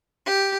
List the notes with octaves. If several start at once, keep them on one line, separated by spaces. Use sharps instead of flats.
G4